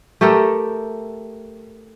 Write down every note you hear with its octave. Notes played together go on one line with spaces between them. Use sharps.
A3 G4 A4 A#4